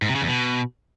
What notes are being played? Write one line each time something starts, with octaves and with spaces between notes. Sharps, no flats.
G#2
C3
C#3
E2
B2